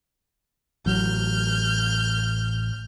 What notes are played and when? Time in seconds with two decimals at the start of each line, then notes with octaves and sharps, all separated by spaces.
0.86 A1 F#3 F6 G6